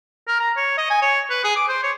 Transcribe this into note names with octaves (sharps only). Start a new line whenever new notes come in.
A#4
A#5
C#5
D#5
G#5
C#5
B4
G#4
D6
C5
C#5